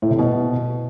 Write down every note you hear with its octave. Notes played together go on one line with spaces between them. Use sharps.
A2
C3
B2